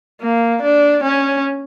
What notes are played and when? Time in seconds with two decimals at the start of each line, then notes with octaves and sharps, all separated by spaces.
0.21 A#3
0.63 D4
1.03 C#4